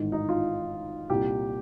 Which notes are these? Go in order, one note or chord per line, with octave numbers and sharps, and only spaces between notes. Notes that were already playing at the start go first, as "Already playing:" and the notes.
Already playing: A1 G#2 D#3
D#4
F4
C2 A#2 G4